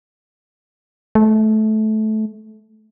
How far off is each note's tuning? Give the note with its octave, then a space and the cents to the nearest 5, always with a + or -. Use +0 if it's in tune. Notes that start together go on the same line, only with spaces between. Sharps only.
A3 -20